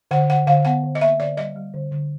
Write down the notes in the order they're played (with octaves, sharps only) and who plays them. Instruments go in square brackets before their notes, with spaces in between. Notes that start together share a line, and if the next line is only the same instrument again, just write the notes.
[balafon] D3 F#5
D3 F#5
D3 F5
B3 F#5
D3
D#5
A#3 E5
D3 D5
G3 D#5
G3
D3
D3